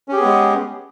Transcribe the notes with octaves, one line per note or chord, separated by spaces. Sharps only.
G#3 B3 C#4 G4 G#4